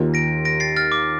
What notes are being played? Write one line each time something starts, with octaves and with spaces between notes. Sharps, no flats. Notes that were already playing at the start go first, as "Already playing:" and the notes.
Already playing: D#2 D#3 A#3 F4
A#6 D7
A#6 D7
A6 C7
F6 A6
D6